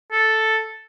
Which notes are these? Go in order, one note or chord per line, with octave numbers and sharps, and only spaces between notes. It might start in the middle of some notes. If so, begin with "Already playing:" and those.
A4